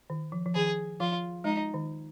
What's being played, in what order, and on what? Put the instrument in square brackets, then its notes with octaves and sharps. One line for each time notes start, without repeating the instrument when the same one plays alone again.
[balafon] D#3
F3
F3
[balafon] D#3 [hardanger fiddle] G#4
[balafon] F3 [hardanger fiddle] F4
[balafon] G#3 [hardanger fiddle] D#4
[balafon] D#3